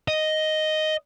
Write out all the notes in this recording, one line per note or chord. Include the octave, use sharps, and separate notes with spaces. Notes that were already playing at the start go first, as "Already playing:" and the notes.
D#5